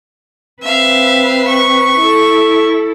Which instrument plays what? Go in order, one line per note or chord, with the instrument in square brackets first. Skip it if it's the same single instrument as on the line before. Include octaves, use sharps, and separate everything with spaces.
[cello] C4 B4 [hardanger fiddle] E5 F5
[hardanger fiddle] C#6
[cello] E4 A4